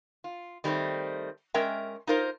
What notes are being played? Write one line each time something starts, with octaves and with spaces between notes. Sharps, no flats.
F4
D#3 G3 A3 A#3 C4
G#3 C#4 A#4 E5 G5
D#4 F4 A#4 C5